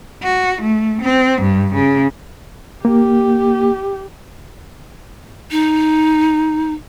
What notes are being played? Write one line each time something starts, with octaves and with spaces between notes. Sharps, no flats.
F#4
A3
C4
G2
C#3
A#3 G4
D#4